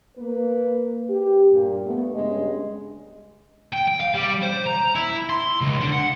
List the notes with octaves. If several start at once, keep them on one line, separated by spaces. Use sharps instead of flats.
A#3 B4
G4
G2 A#2
A3 B3
G2 C#3 G#3 D#5
G5
G5
F5
G3
C5
A#5
E4
C6
C#2
D3
F#5